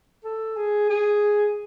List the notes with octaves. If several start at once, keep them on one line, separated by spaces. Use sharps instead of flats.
A4
G#4
G#4